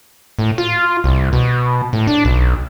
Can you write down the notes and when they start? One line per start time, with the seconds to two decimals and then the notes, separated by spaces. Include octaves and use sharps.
0.39 A2
0.58 F4
1.04 C2
1.33 B2
1.93 A2
2.07 D4
2.25 B1